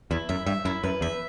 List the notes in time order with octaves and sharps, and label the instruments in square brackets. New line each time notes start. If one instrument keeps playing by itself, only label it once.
[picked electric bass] E2 [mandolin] E4
[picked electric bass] F#2 [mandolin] E5
[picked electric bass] G2 [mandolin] E5
[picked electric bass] F#2 [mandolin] E4
[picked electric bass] F#2 [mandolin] B4
[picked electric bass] E2 [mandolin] E5